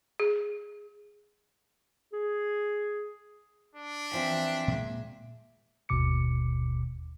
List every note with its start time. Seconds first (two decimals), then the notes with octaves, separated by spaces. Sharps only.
0.20 G#4
2.13 G#4
3.75 D4
4.11 E3 F3 C4 E5
4.68 A#2 G#3
5.89 G1 D#2 B2 D6 C#7